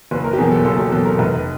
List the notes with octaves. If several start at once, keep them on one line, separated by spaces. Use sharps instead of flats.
F#1 B4
A#4
G4
E2 B2 F#3 A#3 G#4
A4
F#1 A4
G4
E2 B2 F#3 A#3 A4
A#4
F1 B4